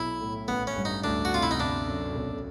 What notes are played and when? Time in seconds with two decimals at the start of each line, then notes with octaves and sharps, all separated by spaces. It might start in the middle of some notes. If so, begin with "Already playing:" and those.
Already playing: B1 E4
0.21 A2
0.48 A1 B3
0.67 C#4
0.76 G2
0.85 D#4
1.04 D2 D4
1.25 F#4
1.32 C3 F4
1.43 E4
1.51 D#4
1.60 G1 D4
1.87 F#2
2.15 B1